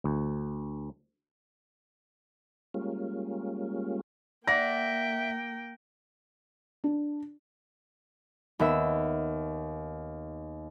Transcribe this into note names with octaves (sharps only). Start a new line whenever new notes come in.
D2
G3 G#3 A#3 C#4 F4
A#3 D5 E5 F#5 G5 A#6
D4
D#2 B3 E5 E6